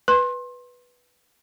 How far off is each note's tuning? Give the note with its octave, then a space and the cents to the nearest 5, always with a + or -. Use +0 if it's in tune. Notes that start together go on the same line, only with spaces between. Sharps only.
B4 -5 C6 +25